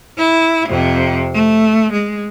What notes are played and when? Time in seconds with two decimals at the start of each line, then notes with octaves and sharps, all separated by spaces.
0.18 E4
0.69 F2 C3
1.34 A3
1.92 G#3